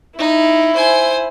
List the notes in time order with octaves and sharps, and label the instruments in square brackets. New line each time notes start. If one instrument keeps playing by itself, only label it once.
[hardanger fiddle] D#4 [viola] E4
[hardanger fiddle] C5 G#5